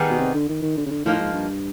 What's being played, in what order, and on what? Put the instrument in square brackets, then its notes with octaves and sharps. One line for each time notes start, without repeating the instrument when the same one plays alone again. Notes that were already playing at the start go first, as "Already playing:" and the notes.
Already playing: [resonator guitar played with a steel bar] D#3 G3 B3 D#4 G#4
[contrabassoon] B2
C3
D3
D#3
D#3
D3
C#3
D3
[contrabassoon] A2 [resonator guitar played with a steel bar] F3 A#3 D#4
[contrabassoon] G#2
G2